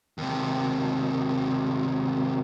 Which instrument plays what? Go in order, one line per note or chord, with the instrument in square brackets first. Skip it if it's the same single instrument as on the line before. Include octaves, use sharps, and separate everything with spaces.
[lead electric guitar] D#2 C3